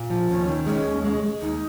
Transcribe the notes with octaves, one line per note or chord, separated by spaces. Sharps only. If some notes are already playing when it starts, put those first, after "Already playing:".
Already playing: A#2
F3
D#2 C#4
D#3
G#3 C#4
D#2
G#3
G#3
D#2 D#4